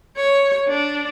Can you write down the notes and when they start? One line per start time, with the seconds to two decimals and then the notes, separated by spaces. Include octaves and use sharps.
0.16 C#5
0.68 D4